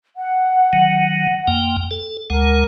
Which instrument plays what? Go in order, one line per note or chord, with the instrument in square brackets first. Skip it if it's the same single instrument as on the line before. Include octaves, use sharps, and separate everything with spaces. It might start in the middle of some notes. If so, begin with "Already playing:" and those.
[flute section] F#5
[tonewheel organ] D#3 F#3
F2 A#3 G5
A4
[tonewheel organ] D2 G#3 F#5 [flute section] A#4